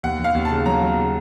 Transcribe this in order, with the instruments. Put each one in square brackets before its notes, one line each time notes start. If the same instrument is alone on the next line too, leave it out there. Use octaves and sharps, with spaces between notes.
[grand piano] D#2 [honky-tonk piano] F#5
[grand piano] D#2
[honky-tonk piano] F5
[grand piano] D#2
[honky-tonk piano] A5
[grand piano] C#3
[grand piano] F#3 [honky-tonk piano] A#5
[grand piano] F#3
C#3